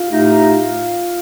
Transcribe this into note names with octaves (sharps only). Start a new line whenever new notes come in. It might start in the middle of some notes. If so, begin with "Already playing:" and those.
Already playing: F4
A2 A3 D#4 G4